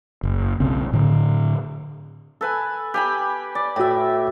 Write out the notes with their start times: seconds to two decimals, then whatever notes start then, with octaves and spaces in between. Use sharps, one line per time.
0.23 F#1
0.60 B1 C#3 C4
0.93 A2 D3
2.41 A4 B4 G#5
2.94 G4 G#5 B5
3.55 D5
3.76 A2 F#4 E5 G5